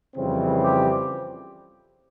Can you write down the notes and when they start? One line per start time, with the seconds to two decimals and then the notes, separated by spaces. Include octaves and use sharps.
0.16 F2 C#3 E3 G3 C4
0.63 G4